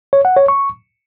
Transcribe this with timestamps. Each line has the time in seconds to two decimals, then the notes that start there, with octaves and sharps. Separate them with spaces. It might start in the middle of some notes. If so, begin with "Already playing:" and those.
0.13 C#5
0.25 F#5
0.37 C#5
0.48 C#6